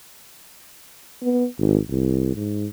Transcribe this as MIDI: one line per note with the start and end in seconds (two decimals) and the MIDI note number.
1.22 1.46 59
1.58 1.79 32
1.90 2.32 36
2.35 2.67 44